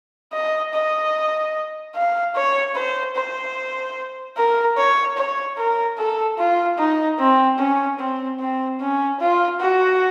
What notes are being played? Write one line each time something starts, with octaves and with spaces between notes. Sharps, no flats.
D#5
D#5
F5
C#5
C5
C5
A#4
C#5
C#5
A#4
A4
F4
D#4
C4
C#4
C4
C4
C#4
F4
F#4